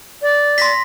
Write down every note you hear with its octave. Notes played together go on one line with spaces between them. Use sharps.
D5
C6 A#6 B6